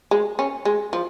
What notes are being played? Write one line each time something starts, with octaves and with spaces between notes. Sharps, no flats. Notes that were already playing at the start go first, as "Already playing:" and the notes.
G#3
C#4
G#3
F3